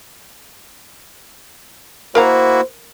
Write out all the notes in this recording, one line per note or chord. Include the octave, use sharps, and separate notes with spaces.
A#3 E4 F#4 A#4 C5 F5 A#5